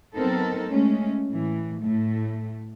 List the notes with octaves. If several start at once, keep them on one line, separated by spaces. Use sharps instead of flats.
F#3 B3 C4 D#4 A4 A#4
G#3 A3 C#4
A2 E3
A2 A3